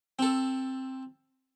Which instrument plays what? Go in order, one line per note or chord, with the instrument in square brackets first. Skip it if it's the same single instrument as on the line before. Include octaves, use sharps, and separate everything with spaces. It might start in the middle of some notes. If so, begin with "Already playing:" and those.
[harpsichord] C4 A4